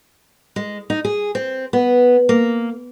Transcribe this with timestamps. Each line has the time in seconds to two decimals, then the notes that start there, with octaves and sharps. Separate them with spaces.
0.56 G#3
0.90 D#4
1.05 G#4
1.35 C4
1.73 B3
2.29 A#3